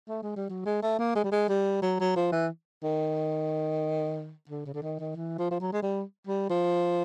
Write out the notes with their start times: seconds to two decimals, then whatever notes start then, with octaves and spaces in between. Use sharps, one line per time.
0.09 A3
0.23 G#3
0.36 G3
0.49 F#3
0.66 G#3
0.83 A3
0.99 A#3
1.16 G#3
1.24 G3
1.32 G#3
1.49 G3
1.82 F#3
2.00 F#3
2.16 F3
2.32 E3
2.83 D#3
4.49 D3
4.66 C#3
4.74 D3
4.83 D#3
4.99 D#3
5.16 E3
5.38 F3
5.51 F3
5.60 F#3
5.73 G#3
5.83 G3
6.27 G3
6.50 F3